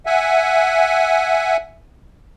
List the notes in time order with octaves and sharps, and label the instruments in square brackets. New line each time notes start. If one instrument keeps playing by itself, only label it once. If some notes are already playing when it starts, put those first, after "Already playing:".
[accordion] E5 F#5 G#5